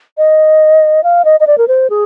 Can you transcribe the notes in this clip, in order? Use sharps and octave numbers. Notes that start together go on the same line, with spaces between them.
D#5
F5
D#5
D#5
D5
A#4
C5
G#4